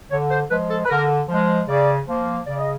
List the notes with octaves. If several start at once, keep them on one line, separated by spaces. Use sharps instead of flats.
D3 C#5
C5
F3 G#3 B4
A4
B4
D3 A#4
F3
G#3
C#3 D5
F3 A#3
C#3 D5
D#5